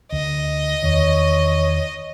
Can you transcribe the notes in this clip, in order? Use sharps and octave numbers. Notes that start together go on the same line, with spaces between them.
D2 D#5
E2 D#3 C#5